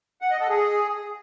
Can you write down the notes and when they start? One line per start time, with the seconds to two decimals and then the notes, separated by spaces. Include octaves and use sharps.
0.22 F#5
0.31 D#5
0.40 A4
0.49 G#4